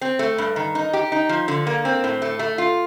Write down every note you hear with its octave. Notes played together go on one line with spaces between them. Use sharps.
C4
A3
G2
D#3
D#4
G4
D#4
F3
D3
A#3
C4
A2
A3
A3
F4